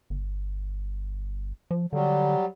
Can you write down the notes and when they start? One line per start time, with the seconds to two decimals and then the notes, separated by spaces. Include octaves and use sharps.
0.10 G1
1.71 F3
1.93 D3 F#3 G3